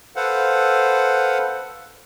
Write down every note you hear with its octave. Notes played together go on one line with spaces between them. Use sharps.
A4 B4 C5 F5 F#5